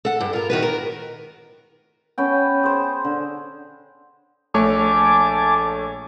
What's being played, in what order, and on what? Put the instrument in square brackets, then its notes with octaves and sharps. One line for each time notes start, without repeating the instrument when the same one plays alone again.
[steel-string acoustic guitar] A4 F#5
G2
F4 A#4
D#3 F#4 B4
A#4
[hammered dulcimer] B3 C#4 G5
G#4 C5
D3
[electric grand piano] A#1 A3 C#5 [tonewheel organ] G#5 A5 D6